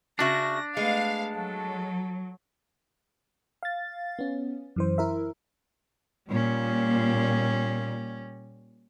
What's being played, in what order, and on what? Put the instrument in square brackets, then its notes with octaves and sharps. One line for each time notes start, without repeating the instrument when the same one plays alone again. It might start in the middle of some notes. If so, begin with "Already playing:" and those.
[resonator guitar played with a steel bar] C#3 F#4 E5 [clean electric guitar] D4 [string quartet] A#6
[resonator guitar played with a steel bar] G#3 [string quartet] A3 B3 [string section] F5
[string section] F#3 [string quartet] A4
[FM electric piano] F5 A6
B3 C#4
F#2 E3 C5
E4 A#4 E5
[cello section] A#2 [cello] G3 C#4